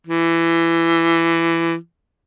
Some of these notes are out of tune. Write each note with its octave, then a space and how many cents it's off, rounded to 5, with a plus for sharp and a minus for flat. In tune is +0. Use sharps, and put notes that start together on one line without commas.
E3 +20